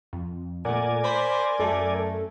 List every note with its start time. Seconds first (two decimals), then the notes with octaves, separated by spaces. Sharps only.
0.13 F2
0.65 A#2 A3 A#4 D5 F#5 G#5
1.04 C5 B5
1.59 F#2 A3 A4